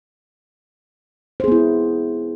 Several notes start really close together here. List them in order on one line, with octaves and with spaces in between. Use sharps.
C5 G#4 B3 E4